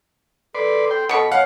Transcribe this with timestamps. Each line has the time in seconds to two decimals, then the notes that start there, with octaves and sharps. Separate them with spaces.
0.55 A4 B4 D5 C6
0.91 G5 C6
1.09 B2 A4 B5 C#6
1.31 C#5 F5 F#5 C#7